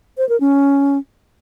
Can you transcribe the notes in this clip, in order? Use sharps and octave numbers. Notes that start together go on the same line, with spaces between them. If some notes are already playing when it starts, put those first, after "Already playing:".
C5
A#4
C#4